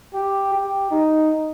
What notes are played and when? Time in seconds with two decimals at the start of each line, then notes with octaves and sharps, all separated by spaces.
0.14 G4
0.53 G4
0.91 D#4